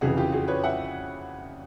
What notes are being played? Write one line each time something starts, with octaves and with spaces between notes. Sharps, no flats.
F2 C#3 E3 F#4 G#4
F4 G4
F#4 G#4
B4 C#5
E5 F#5